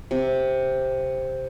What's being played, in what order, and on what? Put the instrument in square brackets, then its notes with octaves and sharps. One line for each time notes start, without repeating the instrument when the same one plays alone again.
[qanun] C3